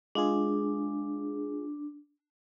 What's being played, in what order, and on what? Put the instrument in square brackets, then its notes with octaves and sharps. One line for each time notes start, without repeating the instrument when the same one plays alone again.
[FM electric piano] G#3 F4 G#4 [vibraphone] D4